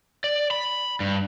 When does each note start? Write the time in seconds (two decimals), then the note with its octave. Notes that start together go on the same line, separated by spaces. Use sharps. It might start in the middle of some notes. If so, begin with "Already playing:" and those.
0.24 D5
0.51 B5
1.00 G2